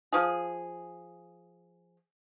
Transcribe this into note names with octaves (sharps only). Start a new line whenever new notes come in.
F3 G#4